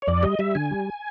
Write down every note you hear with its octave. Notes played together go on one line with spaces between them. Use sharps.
C#5
F2 D5
G3 D#5
G3 E5
D3 G#5
G3